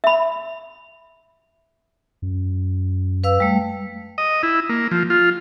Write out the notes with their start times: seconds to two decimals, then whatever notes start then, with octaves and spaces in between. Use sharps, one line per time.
0.04 E5 B5
2.22 F#2
3.24 B4 F5 E6
3.40 G3 A3
4.18 D#5
4.43 E4
4.69 A#3
4.91 F3
5.10 F4